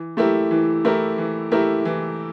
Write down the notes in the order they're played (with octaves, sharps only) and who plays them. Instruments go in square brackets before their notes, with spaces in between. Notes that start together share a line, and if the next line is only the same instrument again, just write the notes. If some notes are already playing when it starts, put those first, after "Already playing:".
Already playing: [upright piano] E3
A3 E4 G4 A#4
E3
A3 E4 G4 A#4
E3
A3 E4 G4 A#4
E3